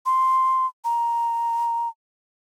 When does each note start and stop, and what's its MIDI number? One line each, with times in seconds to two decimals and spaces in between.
0.06 0.66 84
0.84 1.88 82